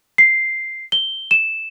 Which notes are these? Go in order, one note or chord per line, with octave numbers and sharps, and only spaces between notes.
C7
G7
E7